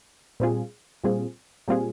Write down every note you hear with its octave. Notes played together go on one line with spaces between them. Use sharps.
A#2 G3 C4 F4 G#4
A#2 G3 C4 F4 G#4
A#2 G3 C4 F4 G#4